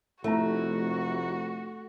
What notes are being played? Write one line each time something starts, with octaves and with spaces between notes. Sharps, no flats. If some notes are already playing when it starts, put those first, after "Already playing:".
F1 A3 E4 F#4 A#5